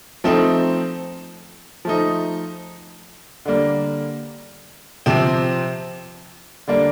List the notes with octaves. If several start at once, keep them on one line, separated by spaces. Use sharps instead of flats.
F3 A3 C4 D#4
F3 A3 D#4
D3 G3 A#3
C3 F3 C4
D3 G3 A#3 D4